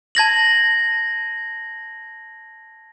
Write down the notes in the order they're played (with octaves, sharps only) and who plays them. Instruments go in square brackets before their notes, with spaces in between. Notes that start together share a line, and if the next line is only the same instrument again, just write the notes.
[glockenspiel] A5 G#6 A#6 F#7